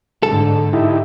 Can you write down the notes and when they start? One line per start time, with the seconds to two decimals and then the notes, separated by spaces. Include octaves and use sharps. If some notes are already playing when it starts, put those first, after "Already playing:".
0.23 G#2 D3 A4
0.73 D#4 E4 G4